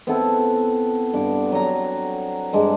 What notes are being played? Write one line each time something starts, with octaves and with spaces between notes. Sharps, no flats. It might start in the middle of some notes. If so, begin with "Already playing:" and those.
B3 C4 E4 A4
G2 D6
F#3 A#5
G2 G#3